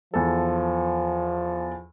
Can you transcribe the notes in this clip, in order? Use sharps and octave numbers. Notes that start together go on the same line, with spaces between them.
E2 F3 A4